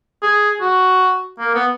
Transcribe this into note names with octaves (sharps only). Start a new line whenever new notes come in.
G#4
F#4
A#3
B3